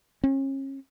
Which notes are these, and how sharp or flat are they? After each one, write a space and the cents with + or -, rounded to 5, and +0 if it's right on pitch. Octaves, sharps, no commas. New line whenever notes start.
C#4 -35